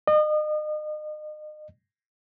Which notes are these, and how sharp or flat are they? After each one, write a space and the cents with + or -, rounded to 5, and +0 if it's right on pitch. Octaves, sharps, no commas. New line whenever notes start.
D#5 -35